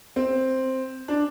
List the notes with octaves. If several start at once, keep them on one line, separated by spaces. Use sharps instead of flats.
C4
D4